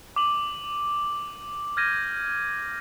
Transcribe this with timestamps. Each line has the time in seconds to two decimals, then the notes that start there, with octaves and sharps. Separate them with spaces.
0.16 D6 D#7 F#7
1.77 F6 G6 G#6 A#6 D#7